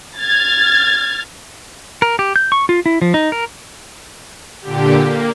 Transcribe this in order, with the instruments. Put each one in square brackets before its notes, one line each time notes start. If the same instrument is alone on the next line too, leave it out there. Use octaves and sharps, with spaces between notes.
[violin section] F6 G#6 A6
[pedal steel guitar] A#4
G4
G6
C#6
F4
E4
F3
D#4
A#4
[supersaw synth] A#2 D3 G4
A#3